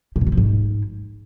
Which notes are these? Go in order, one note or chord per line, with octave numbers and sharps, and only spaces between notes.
C3
A2
C#3
F3
G#2